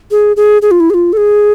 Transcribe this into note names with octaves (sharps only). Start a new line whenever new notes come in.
G#4
G#4
G#4
F4
E4
G#4
F4
A4
G#4